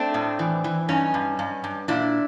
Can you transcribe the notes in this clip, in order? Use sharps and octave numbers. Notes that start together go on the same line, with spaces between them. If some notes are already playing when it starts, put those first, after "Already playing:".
Already playing: A3 C4 D4
A2
E3
E3
G2 C#4 D#4
G2
G2
G2
A#2 D4 E4